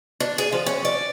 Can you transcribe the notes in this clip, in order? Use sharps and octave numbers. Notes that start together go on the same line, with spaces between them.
D4
G#4
F3
C#4
D5